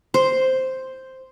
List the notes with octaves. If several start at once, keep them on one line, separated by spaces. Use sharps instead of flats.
C5